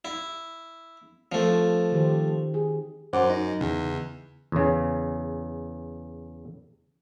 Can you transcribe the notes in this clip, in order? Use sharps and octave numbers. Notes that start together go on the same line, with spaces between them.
E4
F3 A3 C4
F4
D#3 G4 C5
G#4
F#2 C5 F#5 D6
D#4
E2 C#3
E2 C#3